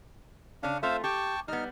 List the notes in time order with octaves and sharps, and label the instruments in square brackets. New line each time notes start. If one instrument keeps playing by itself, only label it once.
[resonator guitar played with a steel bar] C#3 C#4 [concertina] D4 F5
[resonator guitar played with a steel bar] A3 C4 F4 [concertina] C5 E5 F5
[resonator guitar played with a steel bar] G4 [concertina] G5 A5 C#6
[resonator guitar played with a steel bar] G3 B3 [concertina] D#4 F6